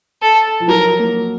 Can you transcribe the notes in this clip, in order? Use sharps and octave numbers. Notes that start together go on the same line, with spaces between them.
A4
F3
F#3 A#4
A#3